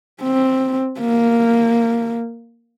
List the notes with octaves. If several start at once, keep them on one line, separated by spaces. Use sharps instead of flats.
C4
A#3